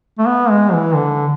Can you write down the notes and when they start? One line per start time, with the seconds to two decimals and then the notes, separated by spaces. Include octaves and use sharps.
0.19 A3
0.27 B3
0.51 G#3
0.73 E3
0.95 D3